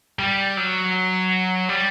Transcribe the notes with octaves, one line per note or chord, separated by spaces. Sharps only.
G3
F#3
G3